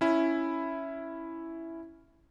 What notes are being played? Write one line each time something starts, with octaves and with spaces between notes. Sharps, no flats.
C#4 E4